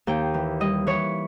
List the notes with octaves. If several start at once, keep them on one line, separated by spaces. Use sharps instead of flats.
D#2 G5
E3
G3 D#5
E3 C#5